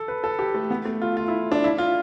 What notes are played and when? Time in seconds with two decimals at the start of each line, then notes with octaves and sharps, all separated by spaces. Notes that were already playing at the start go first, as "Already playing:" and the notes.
Already playing: A4
0.08 B4
0.24 A4
0.39 G4
0.54 A3
0.70 B3
0.85 A3
1.02 F4
1.17 F4
1.28 E4
1.52 D4
1.64 E4
1.78 F4